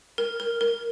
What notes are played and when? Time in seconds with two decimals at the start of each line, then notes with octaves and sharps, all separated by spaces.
0.18 A#4
0.40 A#4
0.61 A#4